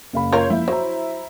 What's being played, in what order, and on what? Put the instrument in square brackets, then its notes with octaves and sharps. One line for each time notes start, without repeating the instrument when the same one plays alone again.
[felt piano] F#1 F5 B5
[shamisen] F4 A#4 [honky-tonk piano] C#5 C6 G6
[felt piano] F3 A#3 [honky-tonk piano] E4
[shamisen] F#3 [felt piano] C5 A#5